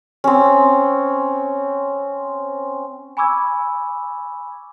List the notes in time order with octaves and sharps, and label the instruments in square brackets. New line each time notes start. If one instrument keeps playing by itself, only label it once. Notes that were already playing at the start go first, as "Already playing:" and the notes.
[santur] C4 C#4
[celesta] G#5 B5 C#6 D6 E6 G#6